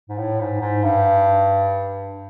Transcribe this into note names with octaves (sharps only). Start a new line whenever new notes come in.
G#2
A2
G#2
G#2
G2